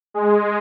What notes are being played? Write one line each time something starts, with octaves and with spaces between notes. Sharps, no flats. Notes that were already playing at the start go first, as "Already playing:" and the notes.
G#3